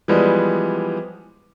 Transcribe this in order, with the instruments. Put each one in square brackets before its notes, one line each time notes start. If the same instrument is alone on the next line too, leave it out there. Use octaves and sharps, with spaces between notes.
[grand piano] E3 F3 G3 G#3 B3